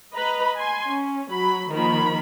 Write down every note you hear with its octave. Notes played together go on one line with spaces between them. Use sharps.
B4 D#5 A#5 B5
G#5 C6
C#4
F#3 B5
D#3 F3 A#3 A#4 B5